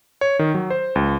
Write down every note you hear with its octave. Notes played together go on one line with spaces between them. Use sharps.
C#5
D#3
F#3
C5
C#2